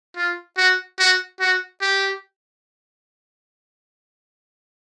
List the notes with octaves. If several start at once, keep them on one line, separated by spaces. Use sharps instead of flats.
F4
F#4
F#4
F#4
G4